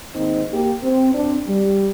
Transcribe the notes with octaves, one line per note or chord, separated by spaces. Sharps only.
G#2 D#3 A#3 C4 D#4
A#3 G4
C4
F#2 C4 D4
G3